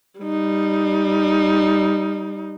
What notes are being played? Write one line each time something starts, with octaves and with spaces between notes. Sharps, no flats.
G3 D#4